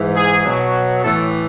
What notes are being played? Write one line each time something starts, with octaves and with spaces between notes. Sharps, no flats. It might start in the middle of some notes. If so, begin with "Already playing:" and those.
Already playing: G#2 E3
G#4
B2 F#3
A2 E3 A4